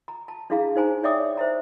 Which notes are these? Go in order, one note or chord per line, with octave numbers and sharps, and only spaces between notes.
A#5
A5
D4 E4 G#4 F5 A#5
D#4 C5 G#5 A#5
C#5 D5 E5 G5 D6 D#6
C5 E5 A#5